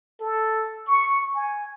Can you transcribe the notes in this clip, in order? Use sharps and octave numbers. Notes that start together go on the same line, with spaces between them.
A4
C#6
G#5